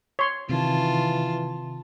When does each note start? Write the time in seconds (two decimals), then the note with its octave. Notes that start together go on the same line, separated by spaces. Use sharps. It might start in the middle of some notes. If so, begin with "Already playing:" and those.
0.19 C#5 C6
0.49 C3 D#3 E3 F4 A5